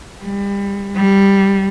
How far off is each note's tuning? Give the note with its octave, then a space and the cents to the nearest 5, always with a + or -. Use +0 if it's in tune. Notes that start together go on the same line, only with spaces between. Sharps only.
G3 +30
G3 +0